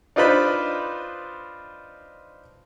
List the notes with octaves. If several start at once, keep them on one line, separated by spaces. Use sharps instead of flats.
D4 D#4 F4 B4 C5 B5